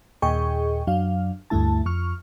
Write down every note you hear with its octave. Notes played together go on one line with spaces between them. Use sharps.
D#2 A#2 G#4 D#5 G5 C#6
F#2 F#3 D4 F5
D2 G2 A3 E4 A5
F2 C#6 F6